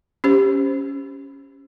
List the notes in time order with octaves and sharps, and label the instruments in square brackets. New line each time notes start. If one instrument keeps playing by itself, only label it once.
[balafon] C#4 G4 C5